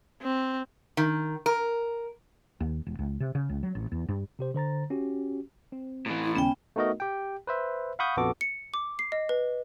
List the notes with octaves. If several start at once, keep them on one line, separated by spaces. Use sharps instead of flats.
C4
D#3
A#4
D#2
E1
C#2
C3
C#3
C#2
F#3
A1
E2
G2
C3 G4 C5
D3 C5 A#5 A6
C#4 F#4 G4
C4
A2 E3
E4
D#2 C#3 G#3 B3 C#4 G5
A3 B3 D#4 F#4 A#4 D#5
G4 G5
B4 C5 E5
F5 F#5 B5 C#6 D#6 G6
A#1 F2 B3 F#4 A4 D6
C#7
D6
C7
D#5
B4